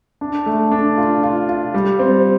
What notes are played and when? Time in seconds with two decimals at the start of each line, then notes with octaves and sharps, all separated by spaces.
0.21 D4
0.46 A3
0.72 D4
0.97 F4
1.23 F4
1.49 F4
1.74 G3
1.99 C4